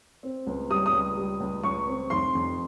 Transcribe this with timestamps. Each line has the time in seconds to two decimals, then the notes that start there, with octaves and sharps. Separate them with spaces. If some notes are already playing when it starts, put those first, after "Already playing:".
0.23 C4
0.47 C#2
0.70 G3 D#6
0.86 D#6
0.93 C#2
1.17 G3
1.40 C#2
1.63 C#2 C#6
1.87 C4
2.10 F1 C6
2.35 F2